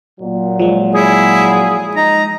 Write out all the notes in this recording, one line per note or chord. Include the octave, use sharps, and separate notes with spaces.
A#2 F#3
F3 G#3
E4 G#4
D#4 A#5